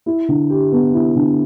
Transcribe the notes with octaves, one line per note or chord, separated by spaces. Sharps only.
E4
D3
G4
B3
E4
D3